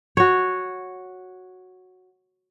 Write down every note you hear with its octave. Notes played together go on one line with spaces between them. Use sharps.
F#4 C#5